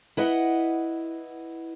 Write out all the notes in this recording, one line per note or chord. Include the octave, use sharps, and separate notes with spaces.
E4 B4 D#5 F#5